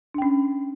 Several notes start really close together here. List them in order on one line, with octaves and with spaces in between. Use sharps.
D4 G5 C#4